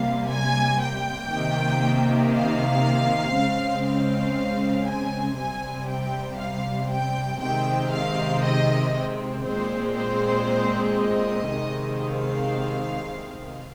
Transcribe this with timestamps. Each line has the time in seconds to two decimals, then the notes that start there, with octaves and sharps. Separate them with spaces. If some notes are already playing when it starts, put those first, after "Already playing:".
Already playing: C3 G3 A#3 F5
0.29 G#5
0.81 G5
1.31 C3 D#3 A#3
2.34 F5
3.35 C#3 G#3 C4
3.86 F5
4.88 G#5
5.38 C3 G3 C4 G#5
5.88 G5
6.40 F5
6.90 G5
7.41 C3 D#3 G#3 C4 G5
7.92 F5
8.43 D#5
9.44 A#2 G#3 C4 C5
9.96 C5
10.97 D#5
11.48 C3 D#3 G#3 C4
11.99 F5